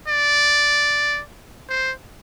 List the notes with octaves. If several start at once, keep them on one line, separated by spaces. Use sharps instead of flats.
D5
C5